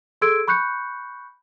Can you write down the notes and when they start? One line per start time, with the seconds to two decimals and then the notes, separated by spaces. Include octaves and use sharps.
0.22 G#4 A4 C6 E6 G#6 D7
0.48 B5 C#6 F#6 G6 C#7